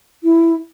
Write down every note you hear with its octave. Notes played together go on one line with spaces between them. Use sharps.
E4